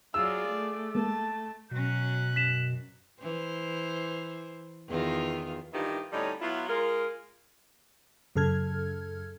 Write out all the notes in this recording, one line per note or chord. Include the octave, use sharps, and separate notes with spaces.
F#3 F4 G#4 D5 E6
A3
G#3 A#3 A5
B2 F#3 C#4 F#6
F#2 B6 E7
E3 C5
E2 D#3 F4
G2 D#3 E3 D#4 F4 G4
A2 D3 G3 C#4 D#4
F#3 B3 E4 F4
G#3 F4 A#4
F#2 C#3 A4 F6 G#6